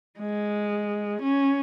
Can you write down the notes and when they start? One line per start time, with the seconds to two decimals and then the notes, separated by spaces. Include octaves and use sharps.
0.19 G#3
1.22 C#4